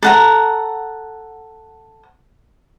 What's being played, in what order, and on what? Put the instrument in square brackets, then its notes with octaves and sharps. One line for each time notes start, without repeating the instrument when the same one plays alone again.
[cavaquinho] A4 F#5 A#5